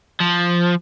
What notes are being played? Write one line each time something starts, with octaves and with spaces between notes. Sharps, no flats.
F3